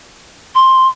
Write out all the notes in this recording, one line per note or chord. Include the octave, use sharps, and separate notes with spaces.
C6